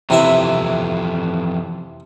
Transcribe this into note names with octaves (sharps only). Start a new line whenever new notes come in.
F2 C3 E3 E4 E5